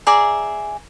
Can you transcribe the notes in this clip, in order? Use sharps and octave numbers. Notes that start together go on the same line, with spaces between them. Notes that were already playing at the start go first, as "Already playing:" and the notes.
G#4 D5 E5 A#5